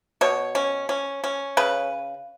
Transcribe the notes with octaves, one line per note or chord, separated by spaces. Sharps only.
B2 C#5
C#4
C#4
C#4
C#3 B4